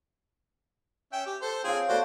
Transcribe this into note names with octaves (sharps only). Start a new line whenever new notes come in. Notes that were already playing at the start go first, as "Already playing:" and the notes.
C#4 E5 G5
G4
A4 C5
C4 F4 G#4 C#5 F5
A3 B3 F#4 C5 D5